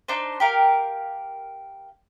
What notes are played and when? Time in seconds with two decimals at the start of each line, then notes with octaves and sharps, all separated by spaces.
0.08 D4 D#4 C5
0.40 G4 A#4 F5